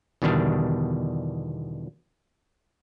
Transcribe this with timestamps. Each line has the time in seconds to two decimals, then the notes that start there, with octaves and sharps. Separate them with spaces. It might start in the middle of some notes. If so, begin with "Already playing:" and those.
0.22 E2 B2 D3 D#3 G3 D4